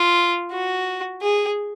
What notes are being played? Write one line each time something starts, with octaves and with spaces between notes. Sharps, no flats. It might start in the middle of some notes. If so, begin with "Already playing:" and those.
Already playing: F4
F#4
G#4